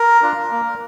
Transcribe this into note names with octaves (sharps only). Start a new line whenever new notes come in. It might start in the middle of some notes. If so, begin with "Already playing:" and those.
Already playing: A#4
D4 F4
A#3